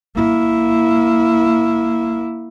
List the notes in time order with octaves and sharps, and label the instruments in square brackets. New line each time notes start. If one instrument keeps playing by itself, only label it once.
[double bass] A#3 E4